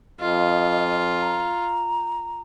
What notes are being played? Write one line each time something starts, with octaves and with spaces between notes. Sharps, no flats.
F2 F4 D#5
A#5